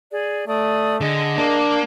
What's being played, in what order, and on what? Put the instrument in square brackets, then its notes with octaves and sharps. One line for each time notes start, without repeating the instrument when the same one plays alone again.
[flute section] G#4 D5
[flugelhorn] A3 [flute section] D5 D#6
[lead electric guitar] D3 [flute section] G#4 D#5
[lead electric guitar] A#3 [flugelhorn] D4